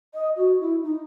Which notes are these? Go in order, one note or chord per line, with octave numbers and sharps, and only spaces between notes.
D#5
F#4
E4
D#4